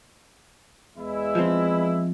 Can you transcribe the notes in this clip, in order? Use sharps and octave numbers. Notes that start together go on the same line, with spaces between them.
E2 G#3 E4
F3 C4